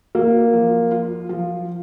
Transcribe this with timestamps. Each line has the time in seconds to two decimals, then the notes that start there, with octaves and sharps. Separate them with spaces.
0.15 A#3
0.53 F3
0.91 F4
1.29 F3